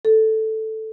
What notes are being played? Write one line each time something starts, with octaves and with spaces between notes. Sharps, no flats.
A4